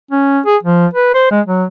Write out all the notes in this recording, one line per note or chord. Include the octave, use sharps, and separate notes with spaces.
C#4
G#4
F3
B4
C5
G#3
F#3